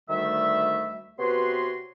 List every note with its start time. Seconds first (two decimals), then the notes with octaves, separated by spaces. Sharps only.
0.09 D2 D#3 G3 A3 E5
1.19 C3 B3 F#4 B4 C#5 C6